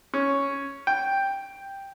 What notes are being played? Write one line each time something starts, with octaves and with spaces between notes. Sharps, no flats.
C#4
G5